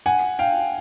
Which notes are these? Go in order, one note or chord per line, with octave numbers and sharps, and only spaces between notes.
F#5 G#5
F5 G5